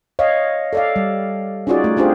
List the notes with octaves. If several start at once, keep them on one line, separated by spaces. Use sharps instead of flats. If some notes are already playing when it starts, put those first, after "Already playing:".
C#5 D#5 F5
A4 D5 F5
G3
C#4 D#4 F4 F#4 G#4 D5
A3
C4 D4 F4 G4 G#4 C5